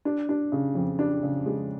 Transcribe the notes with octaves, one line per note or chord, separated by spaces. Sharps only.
D4
D4
C#3
F2
D4
C#3
G#3